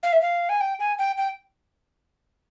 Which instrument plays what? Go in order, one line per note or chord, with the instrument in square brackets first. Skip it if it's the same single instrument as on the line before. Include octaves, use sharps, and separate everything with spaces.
[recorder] F5
E5
F5
G#5
G5
G#5
G5
G5